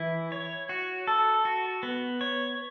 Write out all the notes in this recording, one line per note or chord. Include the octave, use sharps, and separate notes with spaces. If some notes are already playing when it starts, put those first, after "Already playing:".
Already playing: E3 E4
C#5
F#4
A4
F#4
B3
C#5